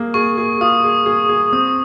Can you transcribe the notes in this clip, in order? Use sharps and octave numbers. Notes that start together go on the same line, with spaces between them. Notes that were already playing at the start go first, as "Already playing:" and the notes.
Already playing: A#3 G#4
G#4 C#6
G#4
F4 D#6
G#4
G#4
G#4
C4 D#6